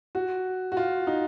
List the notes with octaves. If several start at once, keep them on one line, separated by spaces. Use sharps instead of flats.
F#4
F#4
F4
D#4